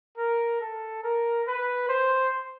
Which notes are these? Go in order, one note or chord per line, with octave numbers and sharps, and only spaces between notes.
A#4
A4
A#4
B4
C5